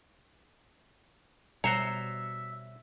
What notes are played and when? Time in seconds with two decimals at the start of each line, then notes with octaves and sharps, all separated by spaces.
1.64 B2 G3 F#4 C5 C#5 E5 A#5
1.86 E5